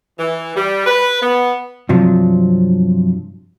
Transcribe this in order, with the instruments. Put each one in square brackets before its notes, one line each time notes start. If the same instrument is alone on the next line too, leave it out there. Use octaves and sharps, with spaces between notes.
[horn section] E3
G3
B4
B3
[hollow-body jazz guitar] G2 C3 F3 F#3